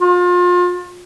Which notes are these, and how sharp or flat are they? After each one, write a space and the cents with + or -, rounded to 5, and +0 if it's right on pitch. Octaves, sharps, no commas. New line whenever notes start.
F4 +35